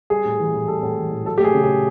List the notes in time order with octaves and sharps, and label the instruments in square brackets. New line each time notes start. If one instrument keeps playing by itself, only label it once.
[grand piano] G3 G#4
A2
E3
A2
G3 A4
A2
E3
A2
F#3 A4
A3 G4
G#4
C#3
G#4